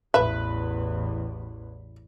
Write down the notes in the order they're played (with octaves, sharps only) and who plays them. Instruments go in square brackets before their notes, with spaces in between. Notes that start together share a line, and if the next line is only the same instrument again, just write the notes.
[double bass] A1 E2 [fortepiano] B4 [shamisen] E5